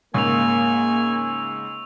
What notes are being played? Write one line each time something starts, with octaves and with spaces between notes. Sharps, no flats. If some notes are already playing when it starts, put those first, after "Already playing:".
G#2 C#3 A#3 G#5 C#6 E6 F7